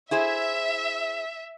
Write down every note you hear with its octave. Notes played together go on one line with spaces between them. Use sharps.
E4 G#4 C5 E5